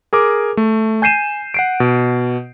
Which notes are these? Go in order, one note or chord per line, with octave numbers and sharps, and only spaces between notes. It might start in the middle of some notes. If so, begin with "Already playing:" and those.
G#4 A#4 D6
A3
G#5 G6 C7 D#7 E7
F#5 C7 D7
B2